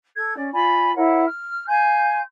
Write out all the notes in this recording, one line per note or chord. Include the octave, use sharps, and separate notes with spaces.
A4 G#6
C#4 D5
F4 D5 G#5 B5
E4 A#4 C#5 F#5
F6
F5 G#5 C6 G6